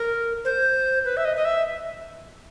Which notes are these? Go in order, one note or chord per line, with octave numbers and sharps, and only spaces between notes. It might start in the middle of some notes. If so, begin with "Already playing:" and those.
Already playing: A#4
C5
B4
E5
D#5
D#5
E5